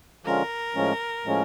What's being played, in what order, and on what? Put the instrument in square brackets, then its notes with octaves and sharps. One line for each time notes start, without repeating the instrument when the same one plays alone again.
[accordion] D3 F3 G#3 C#4 F4 [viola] A#4
[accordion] A2 F3 G#3 C#4
A2 F3 G#3 C#4